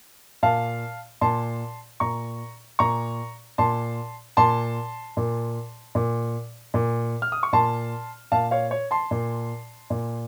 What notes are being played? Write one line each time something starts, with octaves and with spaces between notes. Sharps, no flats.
A#2 F5 A5
A#2 A5 C6
A#2 A#5 C#6
A#2 A#5 C#6
A#2 A5 C6
A#2 A5 C6
A#2
A#2
A#2
F6
D#6
C#6
A#2 A5 C6
A#2 F5 A5
C#5 F5
C#5
A5 C6
A#2
A#2